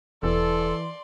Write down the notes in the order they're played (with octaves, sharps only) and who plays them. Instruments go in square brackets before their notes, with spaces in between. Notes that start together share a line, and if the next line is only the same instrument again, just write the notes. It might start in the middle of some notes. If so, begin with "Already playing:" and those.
[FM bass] E1 [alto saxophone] E3 [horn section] A4 [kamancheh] D5 C6